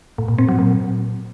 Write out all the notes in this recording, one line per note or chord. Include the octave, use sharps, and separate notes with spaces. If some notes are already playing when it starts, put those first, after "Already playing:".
A2
A#2
C4
F#3
A#2